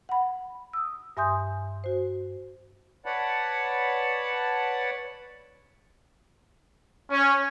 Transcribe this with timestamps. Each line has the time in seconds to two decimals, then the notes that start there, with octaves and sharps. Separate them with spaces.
0.09 F#5 B5
0.73 D#6 E6
1.17 G2 E5 G#5 C6 D#6 G6
1.84 F#4 C5
3.06 B4 C#5 D5 F#5 A5 B5
7.09 C#4